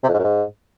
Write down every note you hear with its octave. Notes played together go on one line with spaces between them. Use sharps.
C3
F2
G#2
F#2
G#2